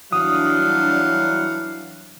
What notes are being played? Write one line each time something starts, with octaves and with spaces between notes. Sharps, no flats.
E3 F#3 G3 D4 F5 F#5 D#6